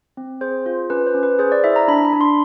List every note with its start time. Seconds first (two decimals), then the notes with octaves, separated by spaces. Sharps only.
0.17 C4
0.41 G#4 C5
0.66 F4
0.90 C#4 B4
1.07 C5
1.15 C#4
1.23 B4
1.39 G#4 C5
1.52 D5
1.64 E4 E5
1.76 A#5
1.88 D4 B5
2.05 B5
2.13 D4
2.21 C6